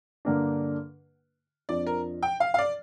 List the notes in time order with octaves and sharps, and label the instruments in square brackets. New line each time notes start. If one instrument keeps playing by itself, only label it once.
[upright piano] G2 D3 A#3 D4
[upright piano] F2 F3 D4 [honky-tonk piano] D5
[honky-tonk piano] A#4
G5
F5
F5
D5